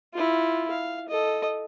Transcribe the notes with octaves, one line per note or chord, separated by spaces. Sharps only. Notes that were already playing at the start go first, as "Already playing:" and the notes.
E4 F4
F5
A4 D#5